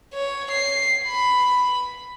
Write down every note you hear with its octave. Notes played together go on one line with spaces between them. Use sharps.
C#5
C7
B5